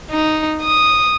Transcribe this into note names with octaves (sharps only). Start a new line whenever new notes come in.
D#4
D#6